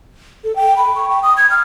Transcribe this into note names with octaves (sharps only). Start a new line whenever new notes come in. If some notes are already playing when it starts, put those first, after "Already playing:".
A4
G5
B5
C#6
G5
D#6
G#6
F6